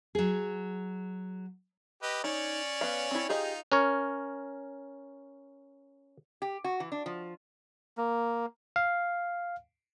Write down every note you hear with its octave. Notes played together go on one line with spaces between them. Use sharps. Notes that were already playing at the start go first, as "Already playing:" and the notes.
F#3 G#4
G4 B4 D#5
C#4 D#4 C#5 D5
B3 F5
C4 E4
D#4 F4 G4 G#4 D#5
C#4 A#4 C#5
G4
F#4
E3
D4
F3
A#3
F5